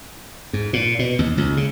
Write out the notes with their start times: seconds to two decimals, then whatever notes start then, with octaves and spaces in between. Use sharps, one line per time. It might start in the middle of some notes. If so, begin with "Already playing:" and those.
0.53 G#2
0.73 A#2
0.99 B2
1.19 D#2
1.38 C#2
1.57 C#3